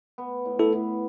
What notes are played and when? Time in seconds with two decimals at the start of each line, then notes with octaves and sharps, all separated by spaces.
0.18 B3
0.45 A2
0.59 E4 A4
0.74 B3